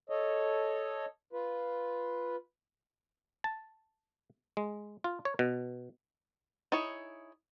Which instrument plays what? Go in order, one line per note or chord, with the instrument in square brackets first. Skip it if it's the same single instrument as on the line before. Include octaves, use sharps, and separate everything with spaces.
[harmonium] A4 C#5 D#5
F4 B4
[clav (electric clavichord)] A5
G#3
F4
C#5
B2
[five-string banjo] D#4 E4 G#4 C#5